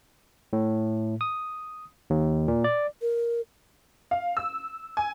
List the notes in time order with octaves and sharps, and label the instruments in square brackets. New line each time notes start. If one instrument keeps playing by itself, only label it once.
[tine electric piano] A2
D#6
D#2
A#2
D5
[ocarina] A#4
[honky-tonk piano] F5
E6
G#5